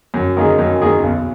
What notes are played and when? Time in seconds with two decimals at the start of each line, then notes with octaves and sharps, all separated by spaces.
0.14 F#2
0.37 D#3 A#3 D#4 G#4
0.58 F#2
0.81 D#3 A#3 D#4 G#4
1.03 B1